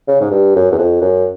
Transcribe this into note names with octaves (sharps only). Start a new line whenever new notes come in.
C#3
G#2
G2
F#2
E2
F2
F#2